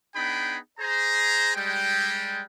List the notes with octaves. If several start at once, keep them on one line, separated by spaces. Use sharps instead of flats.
B3 D4 D#4 G#4 G5 B5
G#4 C5 A#5
G3 G#3 G5